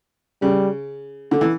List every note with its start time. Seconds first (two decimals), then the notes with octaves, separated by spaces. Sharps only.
0.42 C#3 G3
1.31 D3
1.41 E3